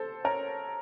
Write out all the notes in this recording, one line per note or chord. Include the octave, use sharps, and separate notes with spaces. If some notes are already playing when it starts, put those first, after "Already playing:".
Already playing: A4 C5
A#4 C#5